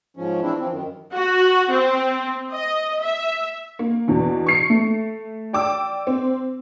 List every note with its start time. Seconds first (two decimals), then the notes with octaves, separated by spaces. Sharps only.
0.17 G#2 F3 C#4
0.42 E3 C4 D4 E4
0.59 E3 F3 C4
0.71 F#2 D#3
1.12 F#4
1.71 C4
2.52 D#5
3.02 E5
3.79 A#3
4.07 E2 B2 D3
4.47 C#6 C7 C#7
4.70 A3
5.53 D5 G5 D6 E6
6.07 C4